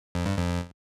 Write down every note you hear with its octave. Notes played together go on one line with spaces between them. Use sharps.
F2
G2
F2